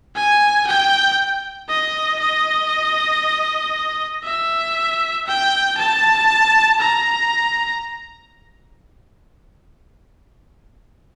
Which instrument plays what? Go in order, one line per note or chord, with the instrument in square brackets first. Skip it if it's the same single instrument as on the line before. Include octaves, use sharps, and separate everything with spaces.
[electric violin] G#5
G5
D#5
D#5
E5
G5
A5
A#5